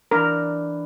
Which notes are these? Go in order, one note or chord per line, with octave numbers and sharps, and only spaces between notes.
E3 D4 A#4